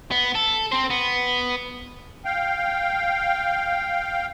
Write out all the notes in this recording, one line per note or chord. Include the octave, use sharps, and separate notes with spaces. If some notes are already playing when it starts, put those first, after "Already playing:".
B3
A4
C4 C5
B3
F5 G5